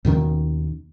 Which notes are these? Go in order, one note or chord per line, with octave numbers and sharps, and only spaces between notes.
D#2 B2 D#3 C#4